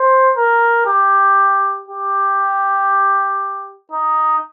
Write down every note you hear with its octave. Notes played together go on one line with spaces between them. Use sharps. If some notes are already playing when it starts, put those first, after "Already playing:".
Already playing: C5
A#4
G4
G4
D#4